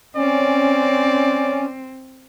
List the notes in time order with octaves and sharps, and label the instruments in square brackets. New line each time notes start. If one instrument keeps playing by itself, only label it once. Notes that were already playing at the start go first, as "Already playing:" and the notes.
[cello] C4 [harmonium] C#4 [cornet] D5